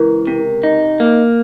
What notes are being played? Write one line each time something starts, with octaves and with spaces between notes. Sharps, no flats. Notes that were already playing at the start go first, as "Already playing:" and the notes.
Already playing: C#2 E3 A#4
C3
D#4
A#3